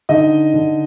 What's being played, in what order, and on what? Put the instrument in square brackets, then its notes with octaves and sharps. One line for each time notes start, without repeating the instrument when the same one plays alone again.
[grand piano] D3 D#4 D#5
D3